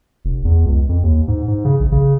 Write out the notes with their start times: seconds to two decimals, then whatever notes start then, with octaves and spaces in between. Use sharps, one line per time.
0.25 F1
0.45 E2
0.66 C#2
0.89 F2
1.03 D#2
1.28 G#2
1.48 G#2
1.65 C#3
1.80 A#1
1.92 C#3